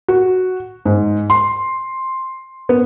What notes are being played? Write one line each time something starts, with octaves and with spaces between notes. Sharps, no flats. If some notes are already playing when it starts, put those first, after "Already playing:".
F#4
G#2
C6
B3